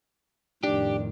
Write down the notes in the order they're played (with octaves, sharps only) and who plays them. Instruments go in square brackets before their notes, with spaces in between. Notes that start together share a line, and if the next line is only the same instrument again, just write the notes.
[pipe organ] F2 A2 D#3 [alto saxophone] D4 [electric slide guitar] G4